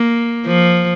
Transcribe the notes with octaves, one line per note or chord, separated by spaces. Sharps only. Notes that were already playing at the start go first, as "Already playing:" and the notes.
Already playing: A#3
F3